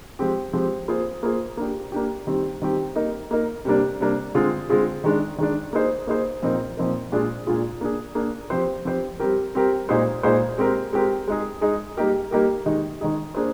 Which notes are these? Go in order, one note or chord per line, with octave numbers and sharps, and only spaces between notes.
F3 G#3 C4 G4
F3 G#3 C4 G4
A#3 F4 G#4 C5
A#3 F4 G#4 C5
A#3 D4 G4
A#3 D4 G4
D#3 G3 C4 G4
D#3 G3 C4 G4
A#3 D#4 A#4
A#3 D#4 A#4
C3 G3 A#3 D4
C3 G3 A#3 D4
D3 G#3 C4 F4 G#4
D3 G#3 C4 F4 G#4
D#3 G#3 D4
D#3 G#3 D4
A#3 D#4 G#4 C5
A#3 D#4 G#4 C5
A#2 F3 C4 D#4 A#4
A#2 F3 C4 D#4 A#4
A#2 G#3 D4 F4 G#4
A#2 G#3 D4 F4 G#4
A#3 D4 G#4
A#3 D4 G#4
F3 C4 G4 C5
F3 C4 G4 C5
G3 C4 G4 A#4
G3 C4 G4 A#4
A#2 G#3 D#4 G#4 C5
A#2 G#3 D#4 G#4 C5
G#3 C4 G4 A#4
G#3 C4 G4 A#4
G#3 D#4 G#4
G#3 D#4 G#4
G3 A#3 D#4 G4 A#4
G3 A#3 D#4 G4 A#4
D#3 G#3 D#4 G#4
D#3 G#3 D#4 G#4
A#3 D4 G#4 C5